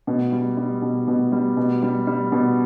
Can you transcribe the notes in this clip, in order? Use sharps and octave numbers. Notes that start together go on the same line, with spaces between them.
B2
G3
G3
B2
B2
G3
B2
G3
G3
B2